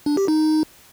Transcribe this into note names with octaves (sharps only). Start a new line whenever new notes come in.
D4
G4
D#4